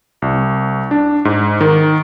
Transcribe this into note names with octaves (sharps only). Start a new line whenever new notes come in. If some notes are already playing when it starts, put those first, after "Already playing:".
C2
D4
G#2
D#3